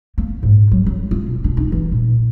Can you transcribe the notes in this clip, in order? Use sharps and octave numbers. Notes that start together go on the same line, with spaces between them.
A#3
G#2
F#3
F#3
F4
B2
D4
D#4
E3
A#2